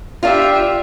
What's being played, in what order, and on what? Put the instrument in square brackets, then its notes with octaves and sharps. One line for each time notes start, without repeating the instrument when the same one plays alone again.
[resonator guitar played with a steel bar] D4 F4 [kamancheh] G4 E5